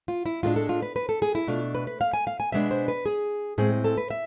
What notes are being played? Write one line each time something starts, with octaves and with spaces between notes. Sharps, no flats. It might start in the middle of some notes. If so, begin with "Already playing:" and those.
F4
E4
A2 G#3 B3 D4 F4
A4
F4
B4
B4
A4
G#4
E4
B2 A3 D4 F4
B4
B4
F5
G#5
F5
G#5
B2 G#3 B3 D4 E5
C5
B4
G#4
A2 G#3 C4 G#4
A4
B4
E5